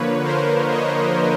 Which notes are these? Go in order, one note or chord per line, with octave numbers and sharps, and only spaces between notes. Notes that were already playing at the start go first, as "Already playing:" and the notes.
Already playing: D3 F3 A#3 B4 C#5
A#4 C5
C#5 D#5